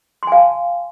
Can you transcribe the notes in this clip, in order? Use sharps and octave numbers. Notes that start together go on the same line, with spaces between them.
F5 G#5 A5 C6